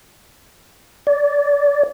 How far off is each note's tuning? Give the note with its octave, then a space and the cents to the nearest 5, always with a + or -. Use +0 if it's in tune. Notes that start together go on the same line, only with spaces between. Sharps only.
D5 -25